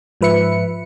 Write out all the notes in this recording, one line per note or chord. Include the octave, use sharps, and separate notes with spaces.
G#2 F3 B4 E5 C#7